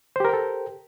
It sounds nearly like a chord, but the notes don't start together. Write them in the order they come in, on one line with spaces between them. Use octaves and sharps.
C5 G4 A#4 G5 A4